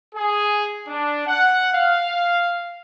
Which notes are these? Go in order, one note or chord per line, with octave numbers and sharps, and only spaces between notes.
G#4
D4
F#5
F5